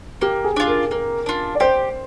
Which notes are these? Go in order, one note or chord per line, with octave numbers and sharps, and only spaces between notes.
A#3 G4
G#4
D4 F4
A#4
A#3 A#4
D4 F4
D5
G4 C5